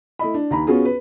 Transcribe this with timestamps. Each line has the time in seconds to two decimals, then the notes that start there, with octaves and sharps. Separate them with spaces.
0.19 A3 E4 D#5 B5
0.34 D4
0.51 D#2 A#5 B5
0.67 B3 C#4 F4 F#4 G#4
0.85 B4